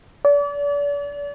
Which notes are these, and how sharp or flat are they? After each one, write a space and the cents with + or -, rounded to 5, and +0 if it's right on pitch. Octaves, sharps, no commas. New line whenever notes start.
D5 -35